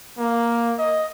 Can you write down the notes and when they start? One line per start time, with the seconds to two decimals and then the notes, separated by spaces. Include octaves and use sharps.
0.18 A#3
0.79 D#5